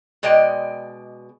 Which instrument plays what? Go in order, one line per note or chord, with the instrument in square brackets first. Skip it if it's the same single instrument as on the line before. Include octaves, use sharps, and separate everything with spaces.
[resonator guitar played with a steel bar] B2 G#3 D5 D#5 G5